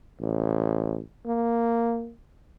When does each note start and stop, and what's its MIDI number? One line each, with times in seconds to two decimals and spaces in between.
0.20 1.00 33
1.26 2.12 58